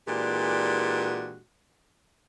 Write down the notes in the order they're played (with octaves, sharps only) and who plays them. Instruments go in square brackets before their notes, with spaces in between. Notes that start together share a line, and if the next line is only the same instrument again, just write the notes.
[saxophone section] A#2 E3 G#3 D4 F#4 G4